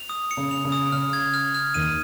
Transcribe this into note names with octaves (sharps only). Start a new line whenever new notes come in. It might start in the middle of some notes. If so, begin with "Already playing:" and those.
Already playing: F7
D#6
C#7
C#3
F7
C#3
D#6
C#3 F6
G#6
F6
F6
D#2 D#3 D#7